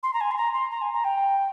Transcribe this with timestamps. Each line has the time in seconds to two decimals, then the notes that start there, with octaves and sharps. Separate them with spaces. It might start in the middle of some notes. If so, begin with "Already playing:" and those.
0.03 C6
0.13 A#5
0.20 G#5
0.31 C6
0.37 A#5
0.54 C6
0.71 A#5
0.81 G#5
0.93 A#5
1.04 G5